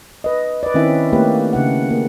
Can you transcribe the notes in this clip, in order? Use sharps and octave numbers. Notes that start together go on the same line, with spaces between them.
B4 D#5
B4 D5
D#3 C4 C#4 E4 E5
A3 A#3 G4 B4
C#3 D4 F#5
A#3